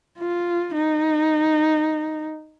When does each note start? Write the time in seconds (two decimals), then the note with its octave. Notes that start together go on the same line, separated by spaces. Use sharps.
0.19 F4
0.74 D#4